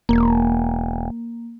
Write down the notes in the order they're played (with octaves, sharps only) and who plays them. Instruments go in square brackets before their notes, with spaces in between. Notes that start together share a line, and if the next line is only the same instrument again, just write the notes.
[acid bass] E1 [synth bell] A#3